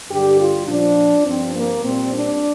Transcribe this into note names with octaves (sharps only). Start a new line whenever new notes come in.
G2 D3 G3 G4
F4
A#2 F3 D4
G2 F3 C4
A#3
A#2 G3 C4
D4